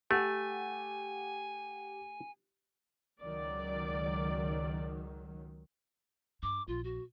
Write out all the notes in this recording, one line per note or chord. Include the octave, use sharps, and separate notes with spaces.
A3 G4 F#5 G#5
C#2 D#3 F#3 D5
G2 D6
A#1 F4
F#4